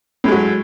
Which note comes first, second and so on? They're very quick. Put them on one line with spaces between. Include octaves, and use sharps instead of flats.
A2 G#3 F#3